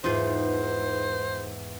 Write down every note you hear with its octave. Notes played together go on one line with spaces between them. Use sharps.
E2 G#2 D#4 F4 G#4 B4 C5